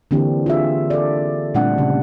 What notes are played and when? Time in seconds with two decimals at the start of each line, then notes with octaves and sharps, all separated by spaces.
0.11 D3 E3 A#3 C4 D4 G4
0.46 F4 G#4 E5
0.90 A4 D5
1.54 A#2 G3 A3 C4 D4 F#5
1.78 C#3